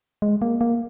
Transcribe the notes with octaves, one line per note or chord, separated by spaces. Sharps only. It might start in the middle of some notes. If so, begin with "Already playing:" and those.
G#3
A#3
A#3